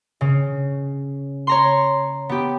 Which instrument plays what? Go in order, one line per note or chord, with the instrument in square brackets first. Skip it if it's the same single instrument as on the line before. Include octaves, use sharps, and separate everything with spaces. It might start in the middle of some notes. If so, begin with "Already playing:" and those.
[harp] C#3
C#5 A#5 C6
B3 G4